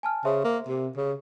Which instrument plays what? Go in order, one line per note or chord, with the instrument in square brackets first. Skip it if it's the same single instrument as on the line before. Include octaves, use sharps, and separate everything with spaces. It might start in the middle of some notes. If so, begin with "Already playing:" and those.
[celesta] G#5 A5 F6
[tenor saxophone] C#3 [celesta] C5 E5 C6
[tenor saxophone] A#3
C3
C#3